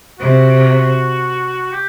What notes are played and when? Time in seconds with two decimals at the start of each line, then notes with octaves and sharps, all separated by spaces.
0.19 C3 F#4
1.73 G4